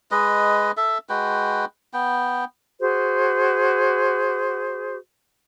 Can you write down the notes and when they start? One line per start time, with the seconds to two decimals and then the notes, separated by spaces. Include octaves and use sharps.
0.11 G#3 B4 D#5
0.77 A4 E5
1.09 G#3 F#4 B4 G5
1.93 B3 G5
2.80 F#4 G#4 C5